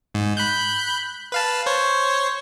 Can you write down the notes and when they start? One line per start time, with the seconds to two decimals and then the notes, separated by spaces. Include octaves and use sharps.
0.14 G#2
0.37 B5 F#6 G6
1.32 B4 F5 A5
1.66 C5 C#5